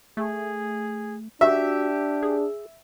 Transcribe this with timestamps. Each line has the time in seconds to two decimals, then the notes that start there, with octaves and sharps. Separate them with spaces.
0.17 A3 G#4
1.41 D4 F#4 G4 E5
2.23 G#4